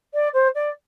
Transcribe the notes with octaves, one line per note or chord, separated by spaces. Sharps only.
D5
C5
D5